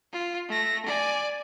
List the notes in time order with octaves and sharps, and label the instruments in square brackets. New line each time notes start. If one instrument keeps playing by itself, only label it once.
[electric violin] F4
A3 A#6
D5 G#5